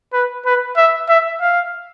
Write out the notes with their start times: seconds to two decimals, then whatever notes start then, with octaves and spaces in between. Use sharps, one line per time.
0.13 B4
0.46 B4
0.77 E5
1.09 E5
1.41 F5